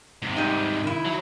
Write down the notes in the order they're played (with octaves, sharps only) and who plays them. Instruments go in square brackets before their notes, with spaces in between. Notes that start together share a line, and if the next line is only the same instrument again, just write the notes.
[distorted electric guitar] G#2 C3
[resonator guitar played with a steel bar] G3 D#4
D#3 E4
[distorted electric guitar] F#3